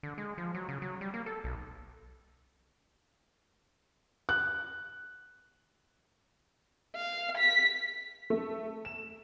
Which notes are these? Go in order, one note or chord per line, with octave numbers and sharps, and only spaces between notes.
D3
G#3
F3
F#3
C#3
F#3
G3
A#3
A4
B1
F#6
F5
B6
A3
E7